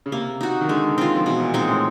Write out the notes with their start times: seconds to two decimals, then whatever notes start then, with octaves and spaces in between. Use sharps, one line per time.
0.06 C#3
0.12 C3 A#3
0.41 D#4 F#4
0.61 D#3
0.68 D3 G#3
0.98 D#3 C4 F4
1.15 F3
1.26 B2 E3
1.40 A#2
1.54 A#2 G#3 C4 D#4
1.69 A2